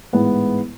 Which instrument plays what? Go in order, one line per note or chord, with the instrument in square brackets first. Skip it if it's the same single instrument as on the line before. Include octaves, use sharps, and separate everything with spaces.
[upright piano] A1 G#2 G#3 B3 E4